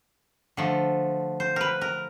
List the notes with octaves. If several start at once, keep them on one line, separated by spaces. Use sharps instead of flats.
D3 F3 A3
C5
A#4 B4
A#4